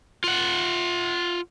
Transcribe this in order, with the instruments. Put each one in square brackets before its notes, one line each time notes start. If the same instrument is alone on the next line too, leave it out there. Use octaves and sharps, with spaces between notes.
[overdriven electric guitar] F4 F#5